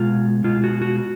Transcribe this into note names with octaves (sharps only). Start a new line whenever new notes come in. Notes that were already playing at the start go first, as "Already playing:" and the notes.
Already playing: B2 G#3 F4
B2 G#3 F4
F#4
F#4